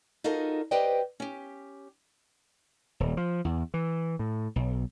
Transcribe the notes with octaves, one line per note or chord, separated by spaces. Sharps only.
D#4 F4 F#4 A4 A#4 D#5
G4 B4 C5 D5 D#5 G5
C#4 G4
D#1
F3
E2
E3
A2
B1